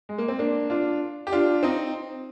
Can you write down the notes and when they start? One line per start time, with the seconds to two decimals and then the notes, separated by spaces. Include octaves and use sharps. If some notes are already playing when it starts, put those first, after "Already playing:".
0.09 G#3
0.18 A#3
0.28 C4
0.39 A#3 D4
0.70 D4 F4
1.27 G4
1.32 D4 F4
1.63 C4 D#4